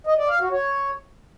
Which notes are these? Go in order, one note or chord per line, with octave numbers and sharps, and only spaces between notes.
D#5
D5
F5
F#4
C#5